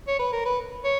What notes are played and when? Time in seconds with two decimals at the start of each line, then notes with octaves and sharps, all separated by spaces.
0.07 C#5
0.19 B4
0.33 A#4
0.45 B4
0.84 C#5